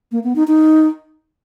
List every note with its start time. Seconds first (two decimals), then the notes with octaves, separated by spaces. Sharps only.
0.12 A#3
0.24 B3
0.36 D#4
0.48 D#4